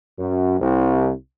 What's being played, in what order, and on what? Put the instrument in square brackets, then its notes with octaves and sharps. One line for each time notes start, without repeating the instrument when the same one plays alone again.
[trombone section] F#2
C2